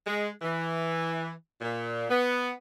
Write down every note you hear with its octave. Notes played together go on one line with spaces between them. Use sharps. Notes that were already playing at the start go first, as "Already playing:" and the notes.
G#3
E3
A#2
B3